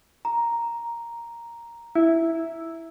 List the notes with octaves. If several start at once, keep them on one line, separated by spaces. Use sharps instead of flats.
A#5
E4